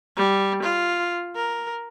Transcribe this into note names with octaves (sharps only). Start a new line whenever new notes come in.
G3
F4
A#4